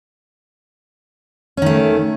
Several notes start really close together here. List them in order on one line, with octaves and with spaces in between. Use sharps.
C#4 D#3 A3